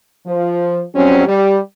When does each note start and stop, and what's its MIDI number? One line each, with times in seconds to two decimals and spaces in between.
0.25 0.81 53
0.94 1.24 41
0.94 1.24 54
0.94 1.24 55
0.94 1.24 60
0.94 1.24 61
1.26 1.57 55